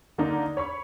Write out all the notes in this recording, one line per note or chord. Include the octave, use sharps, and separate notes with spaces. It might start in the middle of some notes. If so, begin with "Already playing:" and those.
D3 A#3 D4 D#4
C#5 B5 C#6